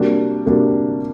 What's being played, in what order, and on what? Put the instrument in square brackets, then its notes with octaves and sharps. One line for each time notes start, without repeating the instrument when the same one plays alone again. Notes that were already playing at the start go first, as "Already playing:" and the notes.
Already playing: [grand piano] C3 G3 A#3 D4 F#4
C3 G3 A#3 D4 F#4